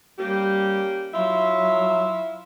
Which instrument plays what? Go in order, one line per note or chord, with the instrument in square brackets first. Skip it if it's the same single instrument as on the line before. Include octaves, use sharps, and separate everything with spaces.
[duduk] G3 [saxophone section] A#3 C#4 G4
[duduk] F#3 [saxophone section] E4 F4 E5